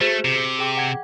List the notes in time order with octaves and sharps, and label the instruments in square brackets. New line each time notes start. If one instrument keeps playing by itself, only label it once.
[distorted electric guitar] A3 [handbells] F#4 G#4 C5
[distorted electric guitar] C3
[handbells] G#4 G5 D6
F#5 G5 G#6